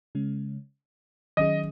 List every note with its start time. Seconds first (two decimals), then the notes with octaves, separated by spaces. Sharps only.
0.15 C#3 G#3 C#4
1.37 D#3 F#3 C#4 G#4 D#5